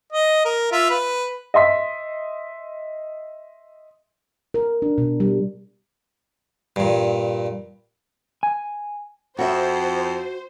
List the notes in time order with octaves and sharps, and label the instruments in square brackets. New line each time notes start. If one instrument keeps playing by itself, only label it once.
[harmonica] D#5
A#4
F4 E5
B4
[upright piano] D#5 E5 C6 B6
[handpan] A#4
D4
B2
G3
[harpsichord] G2 A#2
[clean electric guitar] G#5
[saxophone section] F2 [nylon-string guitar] F#4 E5 [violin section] C5